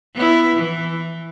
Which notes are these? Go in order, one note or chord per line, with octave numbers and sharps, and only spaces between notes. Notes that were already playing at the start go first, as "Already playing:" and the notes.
B3 E4
E3